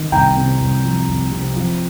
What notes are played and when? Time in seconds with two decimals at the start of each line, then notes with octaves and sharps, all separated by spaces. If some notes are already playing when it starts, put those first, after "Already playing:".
Already playing: D#3
0.12 C2 G5 A#5
0.37 C3
0.60 C2
0.84 F3
1.08 C2
1.32 C3
1.56 F3